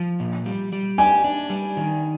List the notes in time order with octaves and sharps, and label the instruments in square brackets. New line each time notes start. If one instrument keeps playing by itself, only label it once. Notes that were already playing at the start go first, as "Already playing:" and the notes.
Already playing: [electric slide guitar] F3
A#2
G3
G3
[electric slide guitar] G4 [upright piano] G#5
[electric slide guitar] D4
G3
D#3